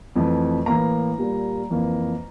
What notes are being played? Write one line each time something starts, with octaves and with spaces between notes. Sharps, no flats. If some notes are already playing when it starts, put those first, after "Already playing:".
F2 E3 A3
A2 E3 A#3 A#5
A#2 G3 A#3
F2 E3 A#3